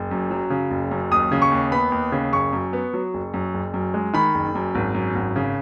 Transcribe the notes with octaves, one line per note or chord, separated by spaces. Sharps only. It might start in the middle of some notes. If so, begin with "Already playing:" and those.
Already playing: F#1
F#2
F#3
C#3
F#1
F#2
D#2 D#6
C#3
C#6
D#2
B3 B5
D#2
C#3
F#1 C#6
F#2
B3
F#3
F#1
F#2
F#1
F#2
G#3
D#3 B5
F#1
F#2
G#1
F#2
G#1
C#3